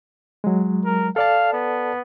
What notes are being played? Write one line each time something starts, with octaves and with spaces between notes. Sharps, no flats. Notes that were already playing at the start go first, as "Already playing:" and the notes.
F#3 G#3
A#4
A4 D5 F5 A5
B3